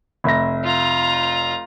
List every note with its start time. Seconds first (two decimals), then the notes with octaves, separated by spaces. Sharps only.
0.24 F1 E5 A#6
0.64 F4 A#5